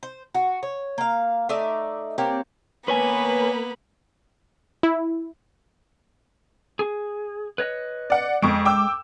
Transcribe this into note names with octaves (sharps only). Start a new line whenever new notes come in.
C5
F#4
C#5
A#3 F5
A3 D#4 D5 E5
A#3 C4 G4 C#5
A#3 B3 B4 C#5 G#5 B5
E4
G#4
B4 C#5 D#5
D5 F#5
F2 G#3 C#6 D7
G5 D6 E6